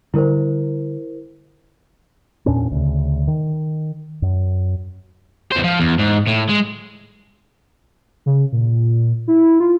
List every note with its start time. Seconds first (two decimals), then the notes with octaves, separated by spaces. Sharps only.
0.14 D3 G3 E4 A#4 C5
2.46 E2 A#2 C#4 D4
2.72 D2 C#3
3.28 D#3
4.22 F#2
5.52 E2 C5
5.64 F3
5.80 E2
5.99 G#2
6.27 A2
6.49 G#3
8.26 C#3
8.52 A#2
9.28 E4
9.60 F4